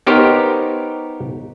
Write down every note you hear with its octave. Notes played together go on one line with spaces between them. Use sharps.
B3 D#4 G4 A#4 C5 C#5